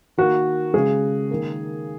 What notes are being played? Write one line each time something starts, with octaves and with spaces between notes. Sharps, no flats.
D#3 A#3 F#4
C#3 G#3 G#4
D#3 A#3